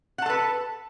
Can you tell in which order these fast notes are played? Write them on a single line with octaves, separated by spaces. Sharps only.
F#5 A5 A4 B4